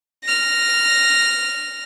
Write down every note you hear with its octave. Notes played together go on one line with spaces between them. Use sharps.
F6 A#6